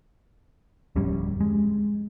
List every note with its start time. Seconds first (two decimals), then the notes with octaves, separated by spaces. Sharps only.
0.96 D1 F2 G3 C#4
1.41 G#3